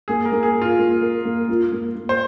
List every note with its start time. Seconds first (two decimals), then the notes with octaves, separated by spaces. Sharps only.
0.08 A#3 G#4
0.25 A#4
0.32 A#3
0.43 G#4
0.55 A#4
0.62 F4
0.79 A#3
1.02 A#4
1.25 A#3
1.49 F4
1.72 A#3
1.96 A#3
2.09 C5